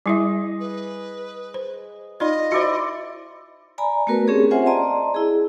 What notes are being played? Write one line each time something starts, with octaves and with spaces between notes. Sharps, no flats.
G3 E4 G#4 D#5 E5
B4
C5
D#4 F4 D5 D#5
E4 F#4 C5 D5 C6
D5 G#5 A#5 B5
A3 B3 F#4 A#4 B4
C4 C#4 G4 G#4 C#5
C4 F4 C5 E5 F#5 G#5
D5 D#5 A5 A#5 C6
E4 G#4